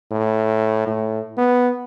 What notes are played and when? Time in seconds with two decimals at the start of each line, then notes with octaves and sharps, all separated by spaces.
0.11 A2
0.87 A2
1.37 B3